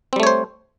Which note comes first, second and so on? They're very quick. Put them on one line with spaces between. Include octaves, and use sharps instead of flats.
C4 G3 A3 C#5 C5